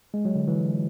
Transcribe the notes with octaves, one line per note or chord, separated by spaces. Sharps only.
G#3
F#3
D3
E3